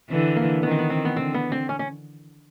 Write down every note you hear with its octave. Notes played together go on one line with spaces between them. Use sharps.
D3 E3
A#3
D#3 B3
C4
B3
C4
B3
D3 C4
B3
C4
C#4
C#4